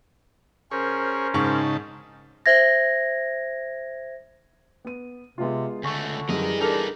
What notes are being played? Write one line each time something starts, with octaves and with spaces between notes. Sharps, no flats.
C#4 G#4 A#4 C5 C#5
G#2 C#3 D#4 A5 C#6
C5 E5 G#6 A#6
B3 D#7
C3 G#3 B3 F4
C#2 D3 A3 G#5 C#6
F#2 E3 G3 G#4 A#4 D#5
B3 D4 D#4 A4 A#4